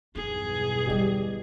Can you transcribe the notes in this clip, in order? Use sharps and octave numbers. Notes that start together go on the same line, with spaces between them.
B1 E2 G2 D#4 G#4
D3 G3 G4 D5 D#5